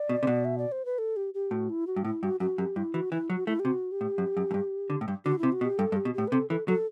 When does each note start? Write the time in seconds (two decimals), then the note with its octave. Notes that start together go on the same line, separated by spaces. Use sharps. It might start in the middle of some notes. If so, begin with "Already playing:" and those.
Already playing: D5
0.09 B2
0.23 C3
0.27 B2
0.45 E5
0.58 D5
0.72 C5
0.85 B4
0.98 A4
1.16 G4
1.34 G4
1.51 A2 F#4
1.70 E4
1.87 F#4
1.96 G2
2.05 A2 E4
2.23 G2 F#4
2.40 F#2 F#4
2.58 F#2 G4
2.76 G2 E4
2.94 E3 F#4
3.12 E3 E4
3.30 F#3 F#4
3.47 A3 E4
3.60 G4
3.65 C3 F#4
3.92 G4
4.01 A2
4.18 F#2
4.37 F#2
4.51 F#2
4.54 G2
4.90 D3
5.01 A2
5.08 G2
5.25 D3 F#4
5.38 C3 E4
5.52 F#4
5.61 B2
5.65 G4
5.78 G2 A4
5.92 G2
5.96 G4
6.05 B2
6.14 A2 G4
6.28 B4
6.32 C3 A4
6.50 E3 A4
6.68 F#3 A4